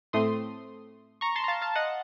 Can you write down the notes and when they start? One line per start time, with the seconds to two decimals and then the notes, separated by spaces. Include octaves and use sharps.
0.13 A2 A3 C4 C6 D#6
1.21 A#5 C#6
1.36 A5 C6
1.44 A#5
1.48 F5 A5
1.62 F5 A5
1.75 D#5 F#5